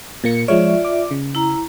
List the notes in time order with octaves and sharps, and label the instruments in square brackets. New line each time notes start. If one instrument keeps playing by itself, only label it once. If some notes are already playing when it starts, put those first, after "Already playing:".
[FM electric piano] A#2 A#3 C#7
[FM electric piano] F3 G#3 C#5 [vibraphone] F4 D5 E5
[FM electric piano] D6
C#3
[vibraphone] E4 A#5